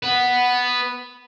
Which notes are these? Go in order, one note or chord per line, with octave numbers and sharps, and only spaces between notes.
B3 B4